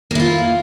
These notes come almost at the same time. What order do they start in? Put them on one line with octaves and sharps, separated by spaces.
A#3 E4 F4